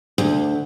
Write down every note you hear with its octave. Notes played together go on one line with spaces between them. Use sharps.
D2